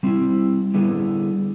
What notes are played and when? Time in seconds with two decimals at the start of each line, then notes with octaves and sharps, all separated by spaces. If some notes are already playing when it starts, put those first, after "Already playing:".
0.03 G3 C4 E4
0.74 D3 G3 B3 E4 G#4